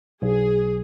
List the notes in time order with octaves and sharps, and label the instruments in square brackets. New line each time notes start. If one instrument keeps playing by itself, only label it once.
[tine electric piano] B1 [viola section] G#4